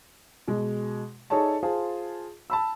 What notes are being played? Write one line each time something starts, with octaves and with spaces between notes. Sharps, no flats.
B2 G#3
D#4 G#4 A4 C#5 D5 A5
F4 G#4 C5 A5
A5 B5 E6